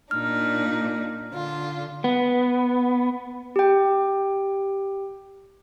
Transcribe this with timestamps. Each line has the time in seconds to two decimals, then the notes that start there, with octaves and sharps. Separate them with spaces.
0.11 A#2 D4 D#4 F6
1.31 D3 F4
2.04 B3
3.56 G4 G5